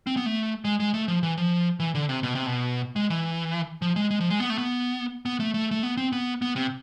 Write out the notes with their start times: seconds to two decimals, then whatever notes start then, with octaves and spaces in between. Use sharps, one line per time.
0.07 C4
0.17 B3
0.26 A3
0.65 G#3
0.80 G#3
0.94 A3
1.08 F3
1.23 E3
1.37 F3
1.80 E3
1.95 D3
2.09 C3
2.23 B2
2.35 C3
2.46 B2
2.96 G#3
3.10 E3
3.82 F3
3.96 G#3
4.11 G#3
4.20 F3
4.30 G#3
4.40 B3
4.50 A3
4.58 B3
5.25 B3
5.40 A3
5.54 A3
5.71 A3
5.83 B3
5.97 C4
6.12 B3
6.42 B3
6.56 C3